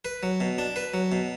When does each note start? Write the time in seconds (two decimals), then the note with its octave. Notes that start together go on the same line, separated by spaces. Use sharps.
0.05 B4
0.23 F#3
0.40 B2
0.58 D4
0.76 B4
0.94 F#3
1.12 B2